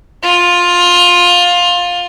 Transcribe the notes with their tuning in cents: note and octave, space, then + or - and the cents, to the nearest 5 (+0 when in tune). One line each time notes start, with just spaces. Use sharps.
F4 +15